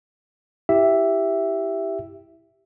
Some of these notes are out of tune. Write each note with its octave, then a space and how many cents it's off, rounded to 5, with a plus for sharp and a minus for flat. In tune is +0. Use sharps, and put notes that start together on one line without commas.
E4 +0 G4 -5 E5 +5